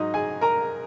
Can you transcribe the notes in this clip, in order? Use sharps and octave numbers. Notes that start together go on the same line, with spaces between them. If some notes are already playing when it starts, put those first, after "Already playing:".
Already playing: G#2 F#3 D#4 D#5
G#4 G#5
A#4 A#5